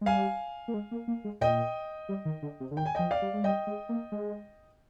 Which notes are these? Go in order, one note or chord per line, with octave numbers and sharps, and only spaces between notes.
G#3
G3 F5 G#5
A#3
G#3
A#3
A#3
G#3
A#2 D#5 G5
G3
D#3
D3
C3
D3
D#3 G5
G#5
F3 D#5 G5
D5 F5
G3
G#3
G3 D#5 G5
G#3
A#3
G#3